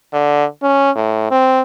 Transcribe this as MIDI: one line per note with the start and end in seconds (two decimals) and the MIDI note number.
0.13 0.45 50
0.62 0.91 61
0.96 1.29 45
1.31 1.61 60